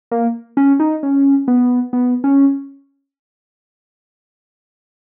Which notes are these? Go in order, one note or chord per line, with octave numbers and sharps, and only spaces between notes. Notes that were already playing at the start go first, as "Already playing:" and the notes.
A#3
C#4
D#4
C#4
B3
B3
C#4